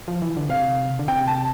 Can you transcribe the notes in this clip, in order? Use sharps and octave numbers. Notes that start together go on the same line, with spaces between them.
F3
E3
D3
C3 F5
D3
C3 G5
A5